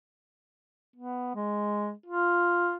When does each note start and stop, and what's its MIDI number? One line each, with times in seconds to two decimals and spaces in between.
0.96 1.35 59
1.35 1.91 56
2.06 2.77 65